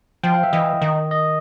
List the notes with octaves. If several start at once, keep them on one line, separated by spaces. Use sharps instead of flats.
F3 G5
F5
E5
E3 D#5
D#3
D#5